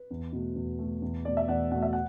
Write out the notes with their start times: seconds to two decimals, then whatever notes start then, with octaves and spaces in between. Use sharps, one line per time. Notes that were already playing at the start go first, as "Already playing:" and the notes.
Already playing: B4
0.10 E2
0.33 B2 A3
0.56 E2
0.79 B2 A3
1.02 E2
1.25 B2 A3 D5
1.37 E5
1.48 E2 D5 F#5
1.71 B2 A3 F#5
1.82 E5
1.93 F#5